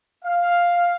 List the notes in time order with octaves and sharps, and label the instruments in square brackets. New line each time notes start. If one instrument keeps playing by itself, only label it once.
[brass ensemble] F5